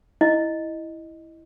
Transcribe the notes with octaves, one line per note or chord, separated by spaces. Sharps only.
E4 D#5